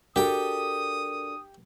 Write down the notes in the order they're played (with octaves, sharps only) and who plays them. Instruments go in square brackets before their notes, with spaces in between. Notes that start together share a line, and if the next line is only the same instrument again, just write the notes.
[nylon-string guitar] D4 F#4 A4 [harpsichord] G4 G5 [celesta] A#4 [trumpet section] D#6